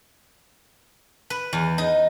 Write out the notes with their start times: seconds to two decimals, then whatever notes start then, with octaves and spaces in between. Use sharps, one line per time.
1.30 B4
1.53 E2
1.78 D#4